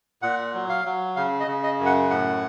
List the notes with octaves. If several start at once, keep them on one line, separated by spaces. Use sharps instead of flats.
A#2 F#5
F#3
F5
F#3
C#3 F5
D#5
C#3
D#5
F#2
F#5
A2 F#5